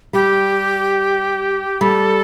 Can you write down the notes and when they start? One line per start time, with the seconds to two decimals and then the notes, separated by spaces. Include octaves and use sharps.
0.13 G3 G4
1.81 G3 A4